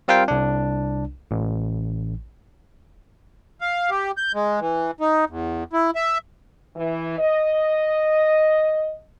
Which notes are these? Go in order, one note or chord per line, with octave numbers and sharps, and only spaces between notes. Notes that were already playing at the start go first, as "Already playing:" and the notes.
G3 C4 F4 A#4 F5 G5
C2 D4
A1
F5
G4
G6
G#3
E3
D#4
E2
E4
E5
E3
D#5